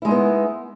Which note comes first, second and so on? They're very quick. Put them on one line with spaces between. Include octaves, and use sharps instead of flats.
E4 G#3 D#4 B3